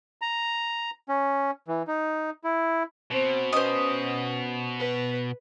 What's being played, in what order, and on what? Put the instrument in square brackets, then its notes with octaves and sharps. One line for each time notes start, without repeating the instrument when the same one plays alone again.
[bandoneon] A#5
C#4
E3
D#4
E4
[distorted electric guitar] B2 [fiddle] C4
[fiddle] C#4 B4 [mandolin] C5 D#5
[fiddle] B4